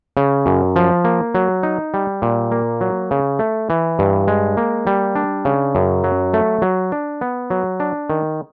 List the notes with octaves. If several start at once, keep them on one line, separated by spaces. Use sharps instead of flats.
C#3
F#2
F3
A#3
F#3
D#4
G3
A#2
A#3
F#3
C#3
A3
E3
G2
G#3
A#3
G3
D4
C#3
F#2
F#3
A3
F#3
D4
B3
F#3
D4
D#3